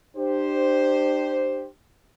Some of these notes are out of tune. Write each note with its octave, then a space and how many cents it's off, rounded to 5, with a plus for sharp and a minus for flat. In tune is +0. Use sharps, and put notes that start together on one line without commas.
D4 +35 G4 +0 C5 +0